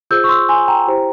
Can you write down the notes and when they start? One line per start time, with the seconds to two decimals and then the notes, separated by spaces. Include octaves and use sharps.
0.11 F4 G#4 C5 E6 G6
0.24 C#6
0.29 C6 E6
0.49 G#5 C6
0.68 G5 A#5
0.88 E4 G4 C5